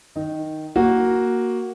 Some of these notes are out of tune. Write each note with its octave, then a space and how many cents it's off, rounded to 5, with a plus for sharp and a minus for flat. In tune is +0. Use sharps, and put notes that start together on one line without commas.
D#3 +0 D#4 +0
A#3 +0 F#4 +0